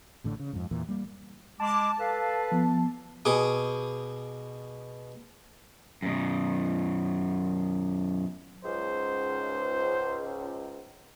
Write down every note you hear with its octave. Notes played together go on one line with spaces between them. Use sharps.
A1 A2 D3
C#3
F2 G#2
E2 A#2 E3
G3 A#3
G#3 A5 D6
A4 B4 F5
F3 B3
B2 G#4 D6
F#2 B2
C#2 G#2 C5